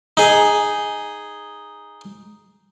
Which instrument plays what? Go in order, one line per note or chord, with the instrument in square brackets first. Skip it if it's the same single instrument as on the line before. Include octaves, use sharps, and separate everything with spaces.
[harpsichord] D#4 G#4